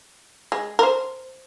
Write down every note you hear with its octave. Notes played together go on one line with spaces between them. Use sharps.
G#3
A#4 C5